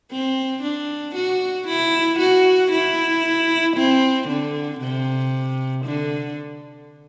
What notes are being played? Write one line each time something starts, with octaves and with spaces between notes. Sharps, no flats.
C4
D4
F#4
E4
F#4
E4
C4
D3
C3
D3